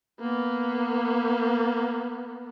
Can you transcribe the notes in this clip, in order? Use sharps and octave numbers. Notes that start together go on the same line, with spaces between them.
A#3 B3